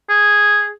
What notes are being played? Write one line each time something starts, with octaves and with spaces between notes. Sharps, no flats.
G#4